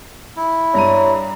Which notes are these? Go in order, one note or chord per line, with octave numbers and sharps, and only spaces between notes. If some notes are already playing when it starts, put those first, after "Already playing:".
E4
G2 C#5 A#5 D#7